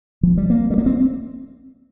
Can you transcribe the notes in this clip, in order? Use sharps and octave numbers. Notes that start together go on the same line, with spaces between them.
F3
G3
A#3
G3
A#3
C4